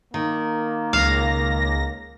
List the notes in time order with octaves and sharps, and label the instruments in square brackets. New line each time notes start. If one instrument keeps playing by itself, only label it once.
[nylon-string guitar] D#3 [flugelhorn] A#3
[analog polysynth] C#2 A#6 [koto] F5